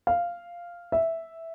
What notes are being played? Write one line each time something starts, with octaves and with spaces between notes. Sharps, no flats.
F5
E5